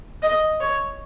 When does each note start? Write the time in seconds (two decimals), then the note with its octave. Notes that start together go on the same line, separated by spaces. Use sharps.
0.22 D#5
0.60 C#5